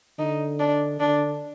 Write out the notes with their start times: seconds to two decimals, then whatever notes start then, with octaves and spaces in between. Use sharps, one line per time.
0.19 D3 D#4
0.60 D4
1.00 D3 D4